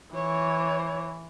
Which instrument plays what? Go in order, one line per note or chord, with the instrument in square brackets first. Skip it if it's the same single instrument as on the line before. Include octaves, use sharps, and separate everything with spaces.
[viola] E3 [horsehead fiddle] C#5